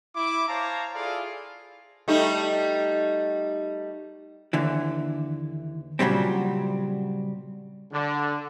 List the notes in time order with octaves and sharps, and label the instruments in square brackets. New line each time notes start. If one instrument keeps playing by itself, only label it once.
[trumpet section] E4 D6
C5 C#5 F5 A5 A#5
E4 F4 G#4 A4 D5 F5
[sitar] G3 A3 D#4
[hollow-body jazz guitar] D#2 D3 E3
A#2 C#3 F#3 G3 C4
[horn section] D3